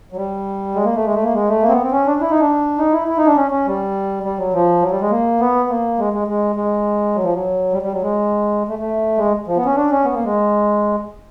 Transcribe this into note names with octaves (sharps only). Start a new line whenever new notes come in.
F#3
G3
G#3
A#3
A3
G#3
A3
A#3
G#3
A3
A#3
C4
B3
C4
C#4
D4
E4
D#4
D4
D#4
E4
E4
D#4
D4
C#4
C#4
G3
G3
F#3
F3
F#3
G3
G#3
A#3
B3
A#3
G#3
G#3
G#3
G#3
F#3
F3
F#3
G3
G3
F#3
G#3
A3
A3
G#3
F3
B3
C#4
D4
C#4
B3
A#3
G#3